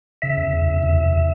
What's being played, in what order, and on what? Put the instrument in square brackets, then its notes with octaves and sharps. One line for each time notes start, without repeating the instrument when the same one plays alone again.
[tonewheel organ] C#3 E5
E2
C#3
E2
C3
E2
C3